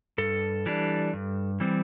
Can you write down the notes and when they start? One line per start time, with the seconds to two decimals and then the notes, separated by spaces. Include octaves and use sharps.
0.18 G2 A4
0.66 E3 G3 D4
1.13 G2
1.60 E3 G3 C4